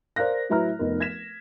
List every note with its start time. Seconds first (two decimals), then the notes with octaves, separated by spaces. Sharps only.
0.16 A#4 C5 D5 F5 F#6 A#6
0.49 A2 F#3 E4 B4 A#5 F6
0.79 F1 B3 D#4 A#4
1.00 G#6 A#6 B6 E7